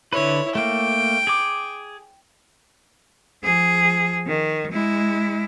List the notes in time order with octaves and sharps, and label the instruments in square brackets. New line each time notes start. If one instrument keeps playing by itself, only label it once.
[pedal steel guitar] D3 B4 [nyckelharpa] E4 C#5
[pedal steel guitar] A3 A#3 [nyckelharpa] G5
[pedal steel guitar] G#4 D6
[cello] F3 G#4
D#3
G#3 E4